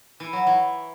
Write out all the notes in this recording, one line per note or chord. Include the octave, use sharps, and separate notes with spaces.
E3
F#3
E3